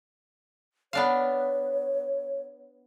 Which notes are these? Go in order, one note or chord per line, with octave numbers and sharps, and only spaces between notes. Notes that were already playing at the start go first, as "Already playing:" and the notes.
B3 D4 C#5 F5